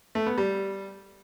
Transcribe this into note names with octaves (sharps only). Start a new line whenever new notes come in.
A3
B3
G3